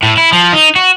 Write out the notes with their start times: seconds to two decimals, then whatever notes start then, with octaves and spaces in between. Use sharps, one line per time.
0.03 A2
0.17 E4
0.32 F3
0.53 D#4
0.76 F#4